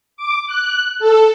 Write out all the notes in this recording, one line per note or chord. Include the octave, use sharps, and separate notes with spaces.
D6
F#6
A4